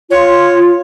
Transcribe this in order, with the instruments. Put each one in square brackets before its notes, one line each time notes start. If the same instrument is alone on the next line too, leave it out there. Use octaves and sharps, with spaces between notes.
[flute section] F4 [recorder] C#5